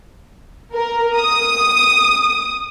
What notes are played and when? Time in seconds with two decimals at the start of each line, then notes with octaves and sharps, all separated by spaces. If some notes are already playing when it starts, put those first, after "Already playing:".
0.73 A#4
1.16 D#6